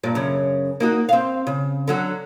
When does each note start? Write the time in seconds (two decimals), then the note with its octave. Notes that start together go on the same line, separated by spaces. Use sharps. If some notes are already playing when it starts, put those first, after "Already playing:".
0.03 G2 A#2 D5
0.15 F#2 C#3
0.80 A#3 D#4 F#4
1.09 C4 F5
1.47 C#3
1.88 D3 F#3 F#4